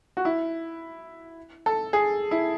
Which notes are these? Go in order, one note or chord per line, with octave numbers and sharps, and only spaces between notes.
F#4
E4
A4
G#4
E4